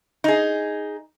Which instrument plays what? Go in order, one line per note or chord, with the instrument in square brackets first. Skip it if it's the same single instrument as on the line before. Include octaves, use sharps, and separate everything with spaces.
[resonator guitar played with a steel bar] D#4 G#4